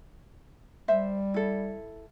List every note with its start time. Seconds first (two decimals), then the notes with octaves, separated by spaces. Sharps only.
0.88 G3 C5 E5
1.34 E4 A4